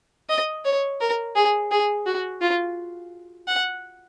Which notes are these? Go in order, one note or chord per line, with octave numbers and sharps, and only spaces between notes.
D#5
C#5
A#4
G#4
G#4
F#4
F4
F#5